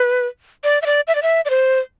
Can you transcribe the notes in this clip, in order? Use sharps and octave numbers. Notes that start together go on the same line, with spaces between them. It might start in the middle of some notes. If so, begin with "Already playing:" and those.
Already playing: B4
D5
E5
D5
E5
D5
E5
D5
C5